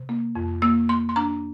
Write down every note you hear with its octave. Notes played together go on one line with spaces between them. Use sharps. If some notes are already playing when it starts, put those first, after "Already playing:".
Already playing: C3
A#3
F2
A#3 E6
A#3 C6
C6
D4 A#5